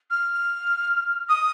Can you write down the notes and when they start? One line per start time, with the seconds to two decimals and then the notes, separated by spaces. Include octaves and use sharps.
0.10 F6
1.29 D#6